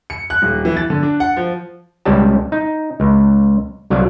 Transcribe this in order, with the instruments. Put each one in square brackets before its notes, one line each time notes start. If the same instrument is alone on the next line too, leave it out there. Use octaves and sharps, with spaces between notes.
[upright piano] C#7
F#6
D#1
E3
A6
D3
D4
F#5
F3
[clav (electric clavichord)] C#2 G3 C#4 G4 A5
D#4
C#2
C2 F#3 D5 F5